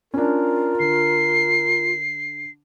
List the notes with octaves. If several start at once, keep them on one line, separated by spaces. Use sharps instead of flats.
C#4 D4 F4 A#4
D3 C7